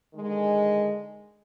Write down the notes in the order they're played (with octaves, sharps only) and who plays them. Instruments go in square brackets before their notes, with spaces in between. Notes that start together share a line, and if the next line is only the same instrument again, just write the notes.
[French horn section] D3 D#3 G#3